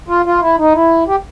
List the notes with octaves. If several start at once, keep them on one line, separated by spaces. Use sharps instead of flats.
F4
F4
E4
D#4
E4
G4